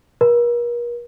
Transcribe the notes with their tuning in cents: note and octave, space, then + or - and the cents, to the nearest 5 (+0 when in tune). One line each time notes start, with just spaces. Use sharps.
A#4 +40